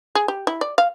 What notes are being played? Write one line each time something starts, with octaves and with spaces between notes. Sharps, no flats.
G#4
G4
E4
D5
F5